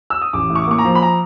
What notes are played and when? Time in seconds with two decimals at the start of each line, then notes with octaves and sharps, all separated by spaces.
0.10 E6
0.22 D#6
0.33 A1 D6
0.50 A2
0.55 C#6
0.63 D6
0.67 A#3 C#6
0.78 A#5
0.85 F3
0.95 B5
1.02 A#5